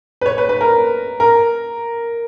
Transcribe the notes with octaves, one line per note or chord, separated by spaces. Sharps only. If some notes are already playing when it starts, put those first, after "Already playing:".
B4
C#5
B4
B4
A#4
A#4